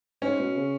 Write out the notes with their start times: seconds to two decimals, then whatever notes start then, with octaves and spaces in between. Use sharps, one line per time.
0.22 G#2 C#4
0.40 B2
0.56 C#3